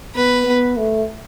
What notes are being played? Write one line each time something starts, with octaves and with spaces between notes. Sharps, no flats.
B3 B4
B3
A3